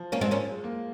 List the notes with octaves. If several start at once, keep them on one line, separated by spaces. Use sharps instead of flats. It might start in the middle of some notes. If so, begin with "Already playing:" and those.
Already playing: F3
A#3 C#4
G#3 C4
A#3 C#4
G#3
A#3